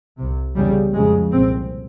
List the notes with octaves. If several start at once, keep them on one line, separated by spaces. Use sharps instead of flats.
C2 C3
E2 C#3 G3
F2 C#3 G#3
C2 A#2 C4